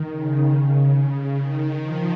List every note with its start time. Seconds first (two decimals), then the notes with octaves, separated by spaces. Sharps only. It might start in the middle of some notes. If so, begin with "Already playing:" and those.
Already playing: D#3
0.09 C#3
0.53 C#3
0.95 C#3
1.38 D#3
1.82 F3